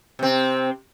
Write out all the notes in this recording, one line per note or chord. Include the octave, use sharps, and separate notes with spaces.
C3 C4